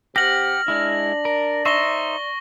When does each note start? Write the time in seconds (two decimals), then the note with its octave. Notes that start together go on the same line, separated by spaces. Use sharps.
0.16 C3 G4 F#5 F6 A#6 F#7
0.68 G#3 D4 E4
1.25 A#4 D5
1.65 D#4 C5 E5 C#6 A#6 G7